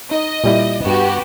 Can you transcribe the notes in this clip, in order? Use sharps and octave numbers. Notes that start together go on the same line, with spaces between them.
D#4 D#5
A#2 G3 E4
G2 B3 F#4 G4